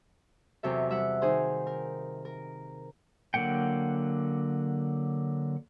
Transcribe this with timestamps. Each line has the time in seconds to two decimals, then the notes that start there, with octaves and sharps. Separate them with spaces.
0.63 E2 C3 F#3 A4 E5
0.89 G3 E5 F#5
1.22 D#3 D#4 G#4 C5
1.67 A#4
2.25 A#4
3.34 D3 F#3 A#3 F#5 G5